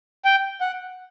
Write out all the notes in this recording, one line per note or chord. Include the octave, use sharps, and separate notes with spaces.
G5
F#5